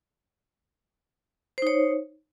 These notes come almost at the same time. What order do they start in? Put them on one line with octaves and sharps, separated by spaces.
C5 D#4 C#5